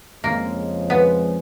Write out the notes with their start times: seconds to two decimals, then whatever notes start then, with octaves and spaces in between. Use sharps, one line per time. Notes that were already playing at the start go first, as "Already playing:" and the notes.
0.23 F2 C#3 F3 G#3 A#3
0.90 B3